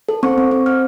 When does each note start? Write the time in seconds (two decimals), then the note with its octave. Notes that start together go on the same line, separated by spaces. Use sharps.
0.09 A4
0.23 C4 C#6
0.38 C4
0.51 C4
0.66 C4 F6